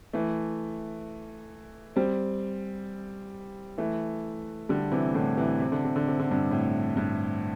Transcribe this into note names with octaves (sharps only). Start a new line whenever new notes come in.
E3 A3
G3 C4
E3 A3
D3 G3
C3 E3
A2 D3
C3 E3
C3
D3
C3
D3
C3
D3
G2 C3
A2
G2